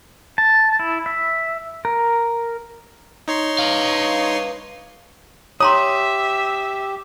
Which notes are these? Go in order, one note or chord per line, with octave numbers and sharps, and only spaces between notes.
A5
E4
E5
A#4
D#4 C#5 C6
B4 F5
G4 C#5 E5 A#5 C6 D#6